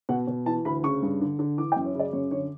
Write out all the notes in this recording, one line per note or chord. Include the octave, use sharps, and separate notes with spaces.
B2 F#5
B2
E3 A5
D2 B5
C#3 C#6
G2
D3
D3
E3 D6
G5
F#2
C#5
C#3 D5
F#2 C#5
D3 C#5